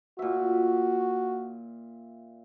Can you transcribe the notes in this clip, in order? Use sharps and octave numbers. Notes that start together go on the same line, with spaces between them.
A#2 F#4 E5